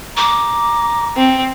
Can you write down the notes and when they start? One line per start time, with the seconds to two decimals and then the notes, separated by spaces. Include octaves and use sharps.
0.17 A#5 D6
1.17 C4